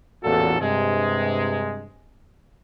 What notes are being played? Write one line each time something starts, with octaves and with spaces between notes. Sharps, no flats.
A1 E2 A#2 F#4 A4
G2 C3 G#3